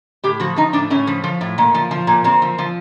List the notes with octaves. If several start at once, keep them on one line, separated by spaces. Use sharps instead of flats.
A2 G4
F3 F#4
F3 D#4
A2 D4
A2 C#4
F3
F3
A2
A#2
F3
F3
A#2
A#2 C4
F3
F3